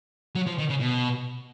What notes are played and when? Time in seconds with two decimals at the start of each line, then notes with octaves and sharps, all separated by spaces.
0.36 F#3
0.47 F3
0.59 D#3
0.70 C#3
0.81 B2